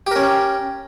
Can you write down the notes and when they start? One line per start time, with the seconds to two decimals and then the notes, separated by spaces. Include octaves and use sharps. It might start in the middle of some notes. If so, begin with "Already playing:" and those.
0.07 G4
0.11 A#4
0.16 C#4